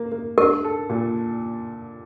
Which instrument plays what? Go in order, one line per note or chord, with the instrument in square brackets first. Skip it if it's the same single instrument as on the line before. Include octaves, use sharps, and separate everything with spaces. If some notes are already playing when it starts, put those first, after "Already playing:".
Already playing: [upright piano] A#3
A#3
[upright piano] D4 [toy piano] A#4
[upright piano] A4
A#2